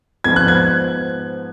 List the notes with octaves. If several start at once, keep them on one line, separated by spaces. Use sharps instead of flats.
G#2 F3 B3 G#6
F#6
G#6